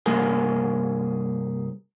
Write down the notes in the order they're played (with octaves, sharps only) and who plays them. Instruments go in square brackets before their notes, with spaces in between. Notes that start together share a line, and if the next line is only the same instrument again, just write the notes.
[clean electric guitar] C2 G2 A#3 G#4